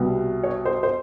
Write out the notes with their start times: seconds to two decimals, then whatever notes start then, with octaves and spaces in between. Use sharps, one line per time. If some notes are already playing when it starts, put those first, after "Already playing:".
Already playing: C2 B2 G3 B3
0.43 C#5
0.65 C5
0.83 C5